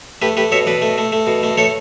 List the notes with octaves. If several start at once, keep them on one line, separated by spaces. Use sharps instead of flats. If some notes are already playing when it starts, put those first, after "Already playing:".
A3 G4 B4
A3 G4 B4
B2 C#5 E5
B2 B4 D5
A3
A3
A3
B2
A3
A3 A4 C#5